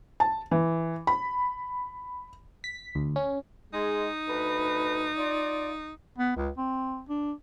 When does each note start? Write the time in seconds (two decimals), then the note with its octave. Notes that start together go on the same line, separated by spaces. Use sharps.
0.20 A5
0.51 E3
1.07 B5
2.64 B6
2.95 D2
3.16 C#4
3.73 G#3 D#4
4.28 D2 B4
5.17 F4 D5
6.18 B3
6.37 C#2
6.58 C4
7.09 D4